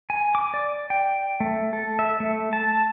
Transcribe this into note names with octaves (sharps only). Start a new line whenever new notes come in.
G#5
D6
D5
G5
A3
A4
E5
A3
A5